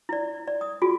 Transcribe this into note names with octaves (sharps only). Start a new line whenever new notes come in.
E4 D5
D5
D#6
F4 F#4 G#4